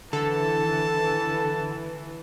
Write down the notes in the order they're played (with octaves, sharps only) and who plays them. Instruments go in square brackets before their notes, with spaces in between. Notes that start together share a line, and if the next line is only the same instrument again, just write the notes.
[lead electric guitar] D3 [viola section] E3 [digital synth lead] A4 [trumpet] A5